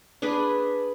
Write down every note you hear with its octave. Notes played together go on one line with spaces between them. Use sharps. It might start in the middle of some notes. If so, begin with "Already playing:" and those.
D4 G#4 B4